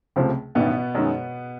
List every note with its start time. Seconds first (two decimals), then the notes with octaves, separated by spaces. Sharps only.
0.16 C#2 C3 F3 A3
0.55 A1 G2 B2 D#3 B3
0.95 F#2 D#3 G#3